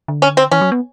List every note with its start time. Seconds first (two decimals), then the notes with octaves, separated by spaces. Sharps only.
0.08 D3
0.22 C#4
0.37 C4
0.51 E3 C#4
0.61 F#3
0.72 B3